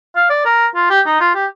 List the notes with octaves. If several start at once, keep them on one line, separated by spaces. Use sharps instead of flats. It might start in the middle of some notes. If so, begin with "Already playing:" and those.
F5
D5
A#4
F4
G4
D#4
F4
G4